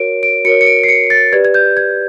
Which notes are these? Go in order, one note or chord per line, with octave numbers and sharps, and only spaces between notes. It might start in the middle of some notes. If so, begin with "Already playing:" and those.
Already playing: F#4 A#4 C#5 D7
D7
F#4 A#4 C#5 C#7
C#7
D7
C7
C#7
A6
G4 B4 D5 G#6
G#6
G6
G#6